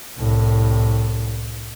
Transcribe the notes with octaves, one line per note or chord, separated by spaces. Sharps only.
C2 A2